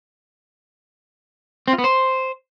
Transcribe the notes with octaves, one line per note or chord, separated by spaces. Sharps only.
C4
F4
B3
C5